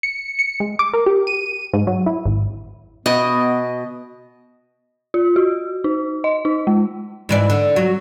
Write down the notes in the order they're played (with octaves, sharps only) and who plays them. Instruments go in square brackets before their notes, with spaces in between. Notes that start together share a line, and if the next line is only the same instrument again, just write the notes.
[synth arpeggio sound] C#7
C#7
G#3
D6
A#4
G4
D#7
G#2
F#3
E4
G#1
[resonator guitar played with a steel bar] B2 [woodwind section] B3 [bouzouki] D#5
[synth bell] F4
F#4
D#4
D#5
D#4
G#3
[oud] G#2 E3 D5
D3
F#3